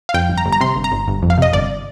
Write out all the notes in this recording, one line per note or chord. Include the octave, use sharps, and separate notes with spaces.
F5
F2 G5
G1
A#5
G1
A#5
C3 C6
G1
A#5
G1
G1
F2
F5
C3 D#5
G1 D5